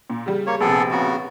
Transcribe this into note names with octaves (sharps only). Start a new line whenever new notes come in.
A#2
C#3 G3
A#3 C#5
A#1 C3 B3 G#4 A4
C#3 B3 F#4